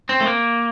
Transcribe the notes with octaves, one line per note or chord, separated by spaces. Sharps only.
C4
A3
A#3